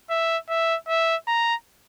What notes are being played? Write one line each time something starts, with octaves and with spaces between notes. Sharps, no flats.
E5
E5
E5
A#5